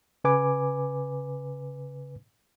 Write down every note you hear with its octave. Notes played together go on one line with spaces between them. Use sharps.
C#3 B4 G#5 D6